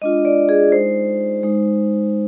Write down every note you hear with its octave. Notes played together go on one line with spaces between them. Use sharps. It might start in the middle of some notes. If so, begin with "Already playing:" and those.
G#3 D4 F4 D#5
D5
G#4
G#3 D#4 C5
G#3 D#4